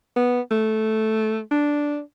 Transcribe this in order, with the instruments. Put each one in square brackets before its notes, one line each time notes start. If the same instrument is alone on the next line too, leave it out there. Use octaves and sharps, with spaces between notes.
[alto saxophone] B3
A3
D4